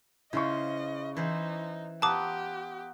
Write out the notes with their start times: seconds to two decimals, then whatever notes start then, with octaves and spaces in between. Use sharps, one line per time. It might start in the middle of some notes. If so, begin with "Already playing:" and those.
0.33 C#3 E4 F4 C5 D#5 C#6
1.17 E3 D#4 C5
2.02 B3 F4 G4 A5 A#5 D6 D#6 F#6